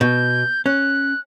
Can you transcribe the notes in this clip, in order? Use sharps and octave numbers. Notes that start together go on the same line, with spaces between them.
B2 G6
C#4 F#6